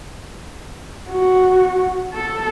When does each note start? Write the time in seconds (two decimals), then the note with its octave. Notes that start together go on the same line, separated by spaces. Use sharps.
1.09 F#4
2.13 A4